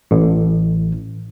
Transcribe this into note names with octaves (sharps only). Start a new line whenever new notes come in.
A1